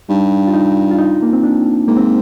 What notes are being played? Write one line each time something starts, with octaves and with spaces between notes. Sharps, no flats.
G2 D#4
F4
D#4
F4
D#4
A#3
C4
D4
G#2 A#3
C4